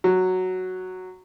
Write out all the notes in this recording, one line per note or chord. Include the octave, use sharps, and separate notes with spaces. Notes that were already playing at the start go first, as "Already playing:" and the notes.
F#3